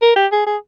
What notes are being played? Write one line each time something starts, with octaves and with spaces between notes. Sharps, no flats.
A#4
G4
G#4
G#4